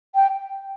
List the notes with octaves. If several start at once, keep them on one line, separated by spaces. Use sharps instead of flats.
G5